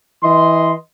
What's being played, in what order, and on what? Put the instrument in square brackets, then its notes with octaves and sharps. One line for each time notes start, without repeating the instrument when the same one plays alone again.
[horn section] E3 D#5 C6